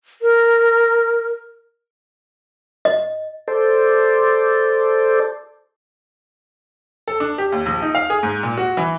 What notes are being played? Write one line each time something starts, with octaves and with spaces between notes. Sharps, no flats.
A#4
D#5
A4 C5 D5
A4
D4
G4
D#2
A#1
D#4
F5
G#4
G#2
A#2
F#4
E3